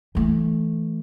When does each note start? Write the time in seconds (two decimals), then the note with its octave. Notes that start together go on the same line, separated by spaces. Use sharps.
0.15 E3 A3